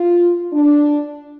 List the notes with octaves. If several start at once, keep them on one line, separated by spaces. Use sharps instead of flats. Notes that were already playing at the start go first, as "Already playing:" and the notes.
Already playing: F4
D4